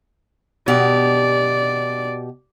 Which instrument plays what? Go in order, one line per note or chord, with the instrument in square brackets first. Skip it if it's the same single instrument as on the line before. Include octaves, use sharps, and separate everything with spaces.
[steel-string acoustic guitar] B2 G4 [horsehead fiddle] D5